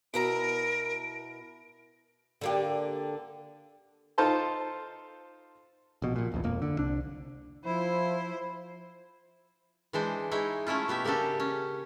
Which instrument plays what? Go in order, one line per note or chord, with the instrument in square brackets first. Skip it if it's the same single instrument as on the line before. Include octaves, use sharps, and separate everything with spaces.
[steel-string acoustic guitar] B2 E4 A#5 [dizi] A#4 [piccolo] D7
[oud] D3 A#3 G4
[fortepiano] D#4 F4 A4 C5 A5 C6
[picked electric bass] A#1 B2
A#1 A#2
D#1 A#1 E2
E1 F2 A#3
D3
C2 D4
[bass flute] F3 [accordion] E4 [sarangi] C5
[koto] E3 G#3 D4 C5
G#3 D#4 E4 C#5
A3 C#4 E4 F4
B2 B3 G4 E5
C#3 A#3 D4 G4 A4
C#4